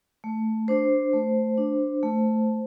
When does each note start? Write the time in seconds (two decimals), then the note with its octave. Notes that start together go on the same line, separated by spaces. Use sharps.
0.24 A3
0.68 D4 C5
1.13 A3
1.57 D4
2.03 A3